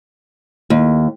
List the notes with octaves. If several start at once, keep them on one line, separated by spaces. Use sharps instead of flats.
D#2